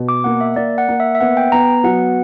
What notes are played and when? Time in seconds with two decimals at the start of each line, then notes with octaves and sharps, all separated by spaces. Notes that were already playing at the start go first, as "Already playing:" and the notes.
Already playing: B2
0.09 D6
0.24 A#3 F#5
0.41 E5
0.56 A#3 D5
0.78 F#5
0.88 A#3
1.00 E5
1.15 E5
1.20 B3 F#5
1.37 G5
1.52 B3 A#5
1.84 F#3 F#5